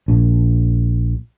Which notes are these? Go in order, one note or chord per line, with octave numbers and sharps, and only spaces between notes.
A#1